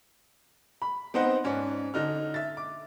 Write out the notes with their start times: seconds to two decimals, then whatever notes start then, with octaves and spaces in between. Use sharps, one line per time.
0.82 B5
1.14 B3 C4 D#4 C5 F#5
1.44 G#2 C#4 D4
1.94 D3 D#4 F6
2.34 E5 A6
2.57 D6